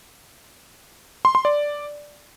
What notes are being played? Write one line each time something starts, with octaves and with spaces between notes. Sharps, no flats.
C6
C6
D5